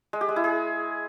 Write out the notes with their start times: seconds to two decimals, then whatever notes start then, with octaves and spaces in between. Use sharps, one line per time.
0.13 G#3
0.21 G4
0.29 G#3
0.36 E4
0.44 G#4